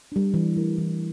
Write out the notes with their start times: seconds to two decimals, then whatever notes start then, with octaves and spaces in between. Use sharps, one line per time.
0.12 G3 D4
0.34 E3
0.57 A3 E4 A#4
0.78 E3